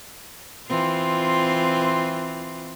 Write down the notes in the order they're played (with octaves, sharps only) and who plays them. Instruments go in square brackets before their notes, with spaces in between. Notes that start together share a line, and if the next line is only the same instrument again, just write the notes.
[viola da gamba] E3 C4 F4